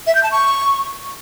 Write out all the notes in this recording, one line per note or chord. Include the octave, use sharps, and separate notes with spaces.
E5
G6
A5
C#6